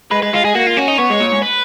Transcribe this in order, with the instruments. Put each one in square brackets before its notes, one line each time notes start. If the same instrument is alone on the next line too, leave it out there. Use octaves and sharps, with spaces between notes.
[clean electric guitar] G#3 [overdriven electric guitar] B4
[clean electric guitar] G#3 [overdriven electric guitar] B4
[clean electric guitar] G#3 [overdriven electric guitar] F4
[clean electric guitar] G#3 [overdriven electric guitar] G#4
[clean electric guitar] A#3 [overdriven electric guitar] F#4
[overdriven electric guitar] F4
[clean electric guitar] C#4 [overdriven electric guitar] F#4
[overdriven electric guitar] D#4
[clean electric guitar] B3 [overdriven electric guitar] C#5
[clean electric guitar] G#3
A#2
G#2
[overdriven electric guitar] B4